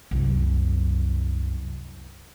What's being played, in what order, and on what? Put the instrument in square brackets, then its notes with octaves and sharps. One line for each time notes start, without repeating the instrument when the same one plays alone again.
[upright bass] C2 F#2